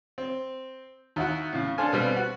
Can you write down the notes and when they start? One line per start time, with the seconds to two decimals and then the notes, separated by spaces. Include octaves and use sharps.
0.18 C4
1.16 D#2 E4 F#4
1.53 A2 C#3
1.78 D4 A4 C5 F5 G#5
1.93 B2 G3 C4
2.16 F#4